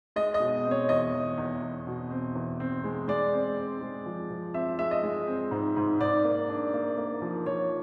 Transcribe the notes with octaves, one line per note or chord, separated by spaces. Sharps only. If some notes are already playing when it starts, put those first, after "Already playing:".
G#3 D#5
D#5
B2
C4
C#5
E2 D#5
E2
E2
E2
B2
C4
E2
C4
G#3
G#3 D5
C4
C4
G#3
F3
F3
C4 E5
G#3 E5
D#5
G#3
C4
G#2
G#2
G#2 D5
A#3
D4
A#3
A#3
F3
F3 C#5